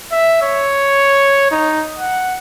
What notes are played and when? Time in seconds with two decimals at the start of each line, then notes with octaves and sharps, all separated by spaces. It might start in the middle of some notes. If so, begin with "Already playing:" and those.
0.12 E5
0.42 C#5
1.51 D#4
1.99 F#5